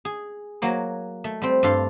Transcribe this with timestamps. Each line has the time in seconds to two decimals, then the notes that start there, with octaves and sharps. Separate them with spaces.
0.05 G#4
0.62 F#3 A#3 C#5
1.24 A3
1.42 G3 C4
1.63 G2 D4 A4 F5 C6